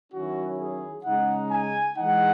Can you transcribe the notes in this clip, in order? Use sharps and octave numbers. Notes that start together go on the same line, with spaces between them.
D#3 F#3 C#4 E4 F#4
G#4
C#3 G#3 D#4 F#5
G#5
E3 G#3 D#4 F#5